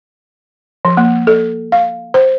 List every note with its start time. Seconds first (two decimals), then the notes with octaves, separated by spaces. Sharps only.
0.85 F3
0.97 A#3
1.27 A4
1.72 F5
2.14 C5